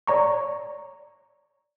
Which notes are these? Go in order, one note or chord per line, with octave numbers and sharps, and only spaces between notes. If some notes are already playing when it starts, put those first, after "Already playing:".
C#5 D5 A#5 C#6